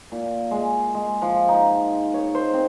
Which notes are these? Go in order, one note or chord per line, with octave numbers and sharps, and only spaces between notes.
A#2
G#3
G#3
F3
D#4
C#5
C5
C4